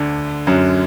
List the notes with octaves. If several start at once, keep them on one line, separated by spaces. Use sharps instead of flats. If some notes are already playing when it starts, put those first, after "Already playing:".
Already playing: D2 D3
F#2 F#3